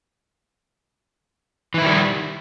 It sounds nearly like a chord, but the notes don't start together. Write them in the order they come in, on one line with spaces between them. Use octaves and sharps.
E3 E4 D#3 G3